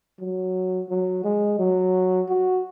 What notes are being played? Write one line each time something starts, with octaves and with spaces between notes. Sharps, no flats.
F#3
F#3
G#3
F#3
F#4